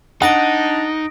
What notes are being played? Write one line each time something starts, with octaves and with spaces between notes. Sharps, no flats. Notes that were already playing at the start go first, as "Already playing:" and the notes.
D4 D#4 F#5 D#6 A#6 D7